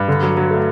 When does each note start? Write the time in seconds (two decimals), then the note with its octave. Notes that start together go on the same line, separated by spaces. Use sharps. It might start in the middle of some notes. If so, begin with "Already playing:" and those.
Already playing: G2
0.08 D3
0.23 F#3
0.37 F#3
0.50 A3